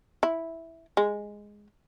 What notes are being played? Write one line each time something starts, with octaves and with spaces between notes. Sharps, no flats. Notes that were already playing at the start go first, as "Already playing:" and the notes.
E4
G#3